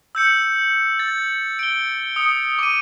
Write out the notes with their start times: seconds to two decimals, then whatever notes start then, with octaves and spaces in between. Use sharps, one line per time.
0.15 E6 G6 C#7
0.99 A6
1.59 D7 G7
2.16 D#6 C#7
2.59 D6 D#7